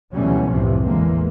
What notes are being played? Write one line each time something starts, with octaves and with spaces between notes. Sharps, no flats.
D2 B2 E3 F#3 G3 C#4
C2 F#2 A2 C3 E3 F3
A1 E2 D3 E3 G#3 A#3